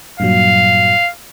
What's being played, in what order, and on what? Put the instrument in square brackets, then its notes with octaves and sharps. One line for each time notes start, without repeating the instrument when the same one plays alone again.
[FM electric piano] G2 A#2 F#3 [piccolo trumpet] F5